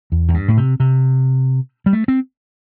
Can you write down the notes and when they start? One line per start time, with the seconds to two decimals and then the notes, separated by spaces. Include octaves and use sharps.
0.12 E2
0.28 E2
0.34 G2
0.48 A2
0.57 C3
0.80 C3
1.86 G3
1.93 A3
2.08 C4